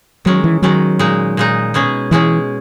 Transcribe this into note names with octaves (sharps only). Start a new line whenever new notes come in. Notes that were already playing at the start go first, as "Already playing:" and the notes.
D#3 F#3 G#3 C#4
E3
D#3 F#3 G#3 C#4
A#2 G#3 D#4
A#2 G#3 D#4
B2 G#3 C#4 G#4
B2 E3 G#3 C#4 G#4